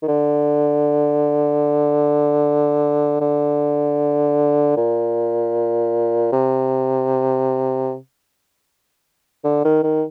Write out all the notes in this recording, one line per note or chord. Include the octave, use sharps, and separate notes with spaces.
D#3
D3
D3
A#2
C3
D3
D#3
D#3